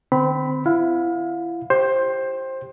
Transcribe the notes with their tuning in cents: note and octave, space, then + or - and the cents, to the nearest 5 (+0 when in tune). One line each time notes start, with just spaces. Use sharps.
D3 +45 C4 -20 B5 +5
E4 +35 F5 +35
G4 +0 C5 +15